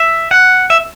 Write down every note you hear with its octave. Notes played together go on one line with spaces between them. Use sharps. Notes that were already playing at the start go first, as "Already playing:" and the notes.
Already playing: E5
F#5
E5